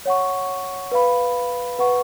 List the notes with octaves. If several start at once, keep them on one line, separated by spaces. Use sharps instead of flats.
C#5 F#5 C#6
B4 F5 B5
B4 F#5 C#6